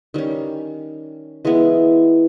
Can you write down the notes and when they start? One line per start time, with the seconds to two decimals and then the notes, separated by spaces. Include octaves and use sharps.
0.14 D#3 G3 C#4
1.45 E3 G#3 B3 E4